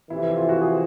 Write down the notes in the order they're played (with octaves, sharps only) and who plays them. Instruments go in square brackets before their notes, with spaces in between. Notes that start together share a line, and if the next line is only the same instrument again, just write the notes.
[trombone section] F2 C3 E3 [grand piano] E4
[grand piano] E4
F4
F#4
G#4